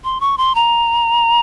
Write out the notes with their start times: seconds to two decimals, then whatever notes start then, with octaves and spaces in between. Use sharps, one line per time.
0.04 C6
0.21 C#6
0.38 C6
0.55 A#5